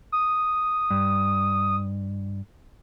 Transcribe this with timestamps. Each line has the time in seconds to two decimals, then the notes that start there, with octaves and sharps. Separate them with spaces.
0.12 D#6
0.91 G2